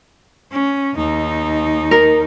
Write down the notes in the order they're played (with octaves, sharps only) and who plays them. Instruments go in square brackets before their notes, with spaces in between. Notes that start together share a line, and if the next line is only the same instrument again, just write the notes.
[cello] C#4
D#2 D#4
[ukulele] A#4